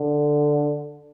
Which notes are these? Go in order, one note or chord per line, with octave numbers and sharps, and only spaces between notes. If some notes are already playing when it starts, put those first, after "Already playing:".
Already playing: D3